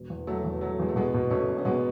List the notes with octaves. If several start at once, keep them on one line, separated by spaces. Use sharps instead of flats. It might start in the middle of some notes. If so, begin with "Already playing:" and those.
Already playing: E1
E2
E1 F#3 A3
E2
E1 F#3 A3
E2 G#3
A3
B2 G#3 B3
B2
B2 A3 C#4
E1
C#4
B2 G#3 B3